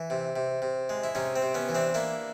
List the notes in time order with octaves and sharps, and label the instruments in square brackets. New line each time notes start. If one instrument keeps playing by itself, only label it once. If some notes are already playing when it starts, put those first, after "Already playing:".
Already playing: [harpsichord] E3
C3
C3
C3
G#3
E4
C3 C#4 D#4
C4
C3
B3 C#4
E3
C4 D4
A#3 D4 E4